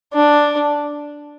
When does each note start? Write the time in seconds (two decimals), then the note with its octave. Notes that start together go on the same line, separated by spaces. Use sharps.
0.13 D4